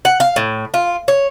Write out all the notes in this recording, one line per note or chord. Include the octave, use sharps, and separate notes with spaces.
F#5
F5
A2
F4
C#5